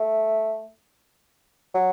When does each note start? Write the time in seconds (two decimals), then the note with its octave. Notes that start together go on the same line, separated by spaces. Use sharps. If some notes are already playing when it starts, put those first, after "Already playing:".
Already playing: A3
1.74 F#3